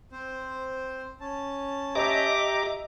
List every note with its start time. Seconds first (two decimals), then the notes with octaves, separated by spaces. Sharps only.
0.12 C4 C5
1.20 C#4 A5
1.95 G4 D#5 E5 A#5 D6